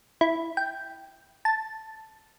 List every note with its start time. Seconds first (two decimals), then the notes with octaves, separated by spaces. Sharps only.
0.21 E4
0.57 G5
1.45 A5